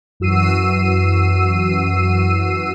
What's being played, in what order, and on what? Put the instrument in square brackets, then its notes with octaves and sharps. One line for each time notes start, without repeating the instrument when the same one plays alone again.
[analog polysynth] F#2 E3 F#4 E6 C7 D#7